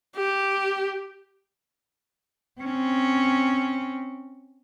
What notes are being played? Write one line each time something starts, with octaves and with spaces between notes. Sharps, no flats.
G4
C4 C#4